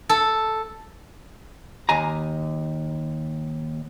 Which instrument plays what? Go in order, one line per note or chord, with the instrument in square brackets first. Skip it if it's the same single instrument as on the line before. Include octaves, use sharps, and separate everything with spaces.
[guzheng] A4
[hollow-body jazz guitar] D#2 G#5 A#5